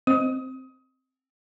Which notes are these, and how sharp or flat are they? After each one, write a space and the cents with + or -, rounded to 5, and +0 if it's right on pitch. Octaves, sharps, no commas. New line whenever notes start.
C4 +0 D#5 +0 D#6 +25